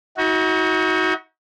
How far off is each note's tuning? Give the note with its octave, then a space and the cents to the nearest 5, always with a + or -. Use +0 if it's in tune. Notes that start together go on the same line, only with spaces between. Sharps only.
D#4 +45 F#4 +0